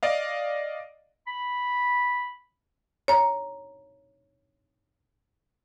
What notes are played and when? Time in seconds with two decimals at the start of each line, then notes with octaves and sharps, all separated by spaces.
0.03 D5 D#5 F5
1.27 B5
3.08 C#5 A#5